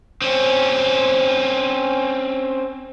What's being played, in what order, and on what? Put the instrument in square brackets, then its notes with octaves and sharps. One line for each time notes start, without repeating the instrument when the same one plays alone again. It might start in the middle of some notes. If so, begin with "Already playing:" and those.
[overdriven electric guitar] C4 C#4